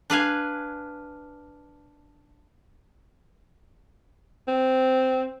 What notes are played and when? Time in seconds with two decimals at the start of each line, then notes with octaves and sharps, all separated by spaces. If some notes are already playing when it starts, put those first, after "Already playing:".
0.10 D4 B4 F5 G#5
4.48 C4